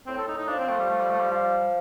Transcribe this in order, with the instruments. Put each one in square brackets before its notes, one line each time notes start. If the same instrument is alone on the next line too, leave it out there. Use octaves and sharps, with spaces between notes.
[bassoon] A2 [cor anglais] C4
[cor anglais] A4
D#4
D#4
[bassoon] F3 [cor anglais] D4
[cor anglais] C4
A3
G3
A3
G3
A3
G3
[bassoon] F3